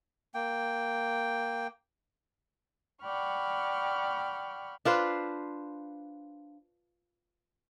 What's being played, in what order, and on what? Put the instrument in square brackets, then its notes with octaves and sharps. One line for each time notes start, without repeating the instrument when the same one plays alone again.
[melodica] A#3 G5
[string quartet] D5 F#5 G5 B5 C#6 F6
[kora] D4 F4 B4 C5